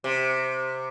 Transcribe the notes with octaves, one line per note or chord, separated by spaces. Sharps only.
C3